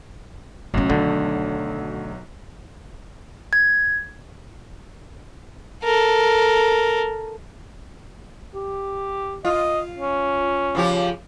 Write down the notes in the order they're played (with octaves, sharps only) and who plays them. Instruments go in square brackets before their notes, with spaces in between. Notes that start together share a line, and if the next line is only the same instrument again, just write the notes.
[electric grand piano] B1 F#3 [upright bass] A3 C#4
[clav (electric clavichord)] D2 D3 [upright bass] D#3
[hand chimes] G#6
[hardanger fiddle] A4 A#4
[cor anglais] G4
[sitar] F4 [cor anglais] D#5
[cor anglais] C#4
[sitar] C#3 F3 G4